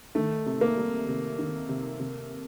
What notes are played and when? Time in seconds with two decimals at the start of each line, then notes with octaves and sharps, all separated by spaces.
0.15 D#3 A3
0.46 C3
0.61 A#3
0.77 G3
1.08 C3
1.39 D#3
1.69 C3
1.99 C3